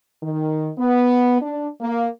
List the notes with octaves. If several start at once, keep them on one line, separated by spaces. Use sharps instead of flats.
D#3
B3
D4
A#3